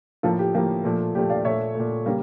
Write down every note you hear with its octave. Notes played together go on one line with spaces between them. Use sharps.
A2 F3 A#3 F4 A4
G4
A2 F3 A#3 G4
A#2 F3 A3
A#2 F3 A3 G4
D5 F5
A#2 A3 C#5 E5
A#2 A3
C#3 G3 A#3